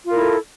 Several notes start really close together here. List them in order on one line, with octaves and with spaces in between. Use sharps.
F4 A#4 E4 A4